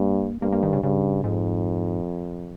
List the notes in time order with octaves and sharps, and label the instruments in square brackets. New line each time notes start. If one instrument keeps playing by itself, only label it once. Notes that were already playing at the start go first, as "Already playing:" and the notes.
Already playing: [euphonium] G2 [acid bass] A#3
[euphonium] G2 [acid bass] A#3
[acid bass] A#3
D#3
C#3
[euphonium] G2 [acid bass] C#3
[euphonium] F2 [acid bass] G#2